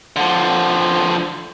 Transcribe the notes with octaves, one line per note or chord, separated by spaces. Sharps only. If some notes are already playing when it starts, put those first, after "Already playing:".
D3 F3